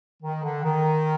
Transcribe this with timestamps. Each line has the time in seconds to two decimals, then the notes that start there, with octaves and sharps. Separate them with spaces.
0.23 D#3
0.43 D3
0.64 D#3